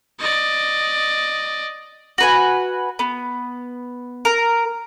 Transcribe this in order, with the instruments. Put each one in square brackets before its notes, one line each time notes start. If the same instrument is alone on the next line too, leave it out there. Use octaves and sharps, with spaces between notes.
[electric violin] D5 D#5
[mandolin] F#4 B4 G#5
B3
A#4